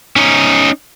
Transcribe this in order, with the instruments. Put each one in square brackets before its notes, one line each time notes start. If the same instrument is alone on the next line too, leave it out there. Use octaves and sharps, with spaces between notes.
[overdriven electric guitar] C#4 D#4